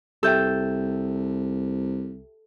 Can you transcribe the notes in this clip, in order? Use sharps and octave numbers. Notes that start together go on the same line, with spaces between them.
C2 G4 A4 E5 G5 G6